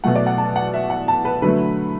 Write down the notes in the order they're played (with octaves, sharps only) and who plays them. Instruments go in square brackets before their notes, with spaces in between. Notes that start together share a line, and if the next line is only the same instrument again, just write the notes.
[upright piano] B2 F#3 A3 F#5
D5
F#5
A5
F#5
E5
F#5
A5
B4
D3 F#3 A3 B4